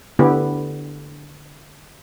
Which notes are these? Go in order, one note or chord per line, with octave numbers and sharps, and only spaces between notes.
D3 B3 E4 G4